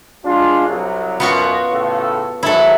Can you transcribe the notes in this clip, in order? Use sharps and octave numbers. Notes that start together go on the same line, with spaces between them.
G#3 D4 F4
C2 F#3
F#2 B2 B3 F4 F#4
A2 C#3 A4
G#2 D#3 F#3 E4 A4